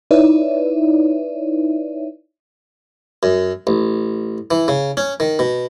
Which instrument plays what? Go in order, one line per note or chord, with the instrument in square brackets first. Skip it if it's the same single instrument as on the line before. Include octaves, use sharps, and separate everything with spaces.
[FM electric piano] D#4 E4 B4 C#5 D5 E5
[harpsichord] F#2
A1
E3
C#3
C#4
D#3
B2